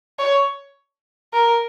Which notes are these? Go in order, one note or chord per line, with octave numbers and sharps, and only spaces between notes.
C#5
A#4